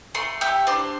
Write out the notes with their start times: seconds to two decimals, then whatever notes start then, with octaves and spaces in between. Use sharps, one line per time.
0.15 A3 C6
0.41 G4 E5
0.67 D4 C5